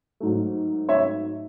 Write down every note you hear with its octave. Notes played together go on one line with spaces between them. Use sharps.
G#2 F#3 A3
C#5 E5